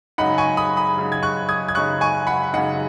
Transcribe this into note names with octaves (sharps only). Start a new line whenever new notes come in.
F#2 C#3 G#3 D#4 F#5 B5
G#5 C#6
B5 D#6
B5 D#6
F#2 C#3 G#3 D#4
G#6
C#6 F#6
D#6 G#6
G#6
F#2 C#3 G#3 D#4 C#6 F#6
G#5 C#6
F#5 B5
F#2 C#3 G#3 D#4 F#5